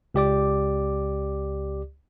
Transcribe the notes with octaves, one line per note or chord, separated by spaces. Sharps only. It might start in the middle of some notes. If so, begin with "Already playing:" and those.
C#2 G4 D5 D6